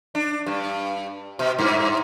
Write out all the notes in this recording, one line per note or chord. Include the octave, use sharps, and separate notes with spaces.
D4
G2
B2
G2